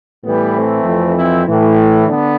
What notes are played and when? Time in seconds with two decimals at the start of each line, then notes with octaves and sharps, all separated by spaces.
0.24 A2 E3 G3 B3
0.55 A3 C4
0.85 F2 E3
1.15 C4 E4
1.46 A2 E3
2.07 D3 B3 D4